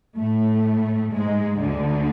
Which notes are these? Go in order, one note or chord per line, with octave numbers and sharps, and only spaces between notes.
A2 A3
G#2 G#3
D2 D3